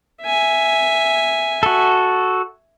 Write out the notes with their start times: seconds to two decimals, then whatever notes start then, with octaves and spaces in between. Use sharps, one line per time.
0.23 E5 G#5
1.63 F#4 A4